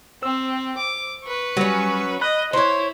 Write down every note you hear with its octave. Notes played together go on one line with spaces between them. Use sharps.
C4 C5 E6
D6
B4 C#6
F#3 G3 C#4
D#5 B5 F#6
E4 C5 C#5